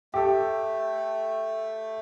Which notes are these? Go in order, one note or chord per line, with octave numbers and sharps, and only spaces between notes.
A3 G4 A4